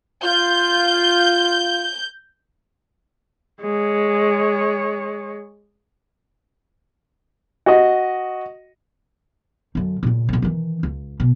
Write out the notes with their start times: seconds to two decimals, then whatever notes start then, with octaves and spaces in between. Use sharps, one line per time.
0.23 F4 G6
3.61 G#3 C#5
7.66 F#4 D#5
9.75 F#2 D3
10.03 A#2 C#3
10.29 D2 A#2
10.42 D#3 E3
10.83 C#2
11.20 B2